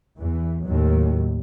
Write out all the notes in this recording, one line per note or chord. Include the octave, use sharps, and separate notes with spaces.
E2 E3
D#2 A2 F#3